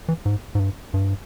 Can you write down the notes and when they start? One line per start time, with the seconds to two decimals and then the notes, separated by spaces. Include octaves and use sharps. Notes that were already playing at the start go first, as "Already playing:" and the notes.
0.08 E3
0.25 G#2
0.55 G#2
0.59 G2
0.94 G2